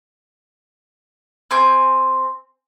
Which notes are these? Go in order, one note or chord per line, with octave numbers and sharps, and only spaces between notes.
C4 G#5 G6